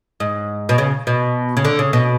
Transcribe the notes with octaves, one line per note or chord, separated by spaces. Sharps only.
G#2
B2
C#3
B2
C#3
D3
C#3
B2